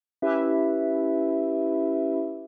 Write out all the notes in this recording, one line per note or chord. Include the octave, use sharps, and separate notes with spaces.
C#4 E4 G4 B4 E5